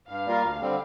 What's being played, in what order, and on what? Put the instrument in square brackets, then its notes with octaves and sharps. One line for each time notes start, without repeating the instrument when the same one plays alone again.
[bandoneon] G2 [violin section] F5
[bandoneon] G3 A#3 F4 A#4
D2
D3 G3 C4